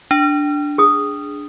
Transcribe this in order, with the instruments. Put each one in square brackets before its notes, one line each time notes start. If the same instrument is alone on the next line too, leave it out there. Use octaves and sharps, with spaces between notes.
[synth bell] D4
[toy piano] G#4 D#6